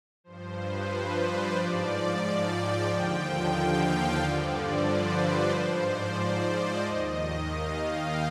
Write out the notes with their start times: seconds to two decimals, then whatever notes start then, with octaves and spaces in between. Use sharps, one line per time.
0.24 G2 F3 C5
0.58 B4
0.90 C5
1.23 D5
1.56 G#2 F3
2.54 G5
2.87 D#2 D3 F3
3.20 G5
3.53 F5
4.19 G2 D3 F3 D5
4.52 C5
4.85 B4
5.18 C5
5.51 G#2 F3
5.84 D5
6.16 D5
6.49 D#5
6.82 D#2 D#3
7.48 F5
7.81 G5